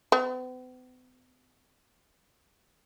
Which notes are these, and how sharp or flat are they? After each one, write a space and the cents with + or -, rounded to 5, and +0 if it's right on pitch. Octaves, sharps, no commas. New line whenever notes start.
B3 +45